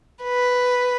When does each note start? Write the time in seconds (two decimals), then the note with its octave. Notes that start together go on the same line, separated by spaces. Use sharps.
0.24 B4